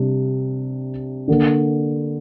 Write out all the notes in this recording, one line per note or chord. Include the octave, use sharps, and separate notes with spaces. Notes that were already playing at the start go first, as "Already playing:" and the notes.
Already playing: C3 G3 D4
D3 A#3 D4